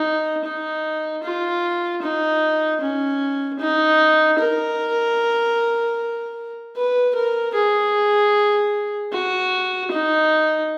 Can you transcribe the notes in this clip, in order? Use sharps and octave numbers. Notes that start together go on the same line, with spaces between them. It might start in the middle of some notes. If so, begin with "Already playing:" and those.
Already playing: D#4
D#4
F4
D#4
C#4
D#4
A#4
B4
A#4
G#4
F#4
D#4